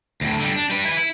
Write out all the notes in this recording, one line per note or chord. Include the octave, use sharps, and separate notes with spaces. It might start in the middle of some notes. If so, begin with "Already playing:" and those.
D2 A2
D3 G3
D4
G3 B4
E4 B4
E4